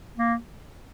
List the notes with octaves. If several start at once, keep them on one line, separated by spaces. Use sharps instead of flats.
A#3